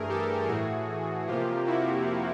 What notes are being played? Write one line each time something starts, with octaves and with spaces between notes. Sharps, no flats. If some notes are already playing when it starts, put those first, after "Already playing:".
Already playing: G2 E3 A3 G#4 A#4
G4 A4
A2 E3 A3 F#4 G#4
F2 C3 F3 A#3 F4 G4
E4 F#4